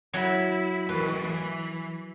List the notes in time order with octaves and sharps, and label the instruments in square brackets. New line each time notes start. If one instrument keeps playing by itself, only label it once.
[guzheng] F#3 [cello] E4
[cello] E3 [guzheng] B4